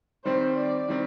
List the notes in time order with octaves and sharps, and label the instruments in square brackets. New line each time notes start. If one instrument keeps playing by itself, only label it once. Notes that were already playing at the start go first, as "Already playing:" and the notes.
[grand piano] D#3 G3 C4 [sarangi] C5
[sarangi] D5
[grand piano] D#3 G3 C4